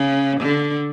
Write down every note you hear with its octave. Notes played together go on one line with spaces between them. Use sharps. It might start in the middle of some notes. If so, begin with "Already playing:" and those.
Already playing: C#3
D3